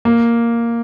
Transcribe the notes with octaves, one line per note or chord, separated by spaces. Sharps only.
A#3